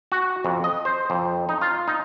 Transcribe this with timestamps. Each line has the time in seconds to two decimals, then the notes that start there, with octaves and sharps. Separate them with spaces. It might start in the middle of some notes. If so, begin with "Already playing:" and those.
0.12 F#4
0.45 F2
0.64 D#5
0.85 C5
1.10 F2
1.49 D#4
1.61 F4
1.88 D#4